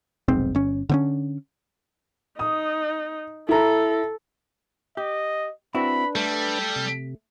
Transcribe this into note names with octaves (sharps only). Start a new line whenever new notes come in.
F1 B1 G#2 C4
G1 C#4
D3 C4 C#4
D#4 D#6
E4 A4 A#5
G4 D#5
C4 D4 E4 F#4 B4 B5
G3 A3 A4
C3